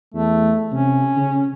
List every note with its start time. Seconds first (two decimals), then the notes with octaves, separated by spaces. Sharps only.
0.14 E2 A3
0.72 C3 C#4
1.17 C#3